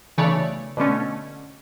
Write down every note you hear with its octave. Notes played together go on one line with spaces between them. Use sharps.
B1 C#3 E3 A3 C#5 D5
B2 D3 A3 C#4